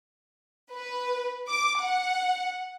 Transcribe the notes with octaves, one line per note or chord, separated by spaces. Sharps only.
B4
D6
F#5